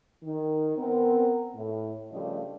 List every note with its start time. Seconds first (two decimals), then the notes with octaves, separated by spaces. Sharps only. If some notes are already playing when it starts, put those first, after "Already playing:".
0.23 D#3
0.76 B3 C4 A#4
1.55 A2
2.11 G2 C#3 F3 G3 A3 D#5